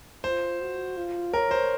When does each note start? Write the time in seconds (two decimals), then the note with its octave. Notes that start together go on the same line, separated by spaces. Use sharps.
0.23 F4 C5
0.60 F#4
0.97 F4
1.33 A#4 C#5
1.51 C5